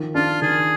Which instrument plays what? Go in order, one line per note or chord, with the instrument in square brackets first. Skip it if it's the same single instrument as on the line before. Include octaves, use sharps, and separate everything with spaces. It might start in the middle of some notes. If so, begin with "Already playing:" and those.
Already playing: [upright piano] D#3 F3
[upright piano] D4 [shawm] F4
[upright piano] D#3 [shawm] G#4